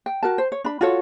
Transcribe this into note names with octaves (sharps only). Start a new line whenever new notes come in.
G5
F#4 A#4 A5
C5
C#5
D4 B5
F4 F#4 A4 C#5